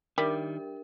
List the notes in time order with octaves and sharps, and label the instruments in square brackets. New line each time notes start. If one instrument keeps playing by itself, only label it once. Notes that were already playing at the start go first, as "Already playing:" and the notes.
[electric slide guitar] D#3 [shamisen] G3 [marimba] D4 G4 E5 [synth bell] A#4